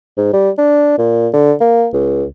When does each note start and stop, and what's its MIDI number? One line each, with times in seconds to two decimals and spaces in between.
0.17 0.32 44
0.33 0.50 55
0.58 0.94 62
0.98 1.28 46
1.33 1.54 50
1.61 1.88 58
1.93 2.25 37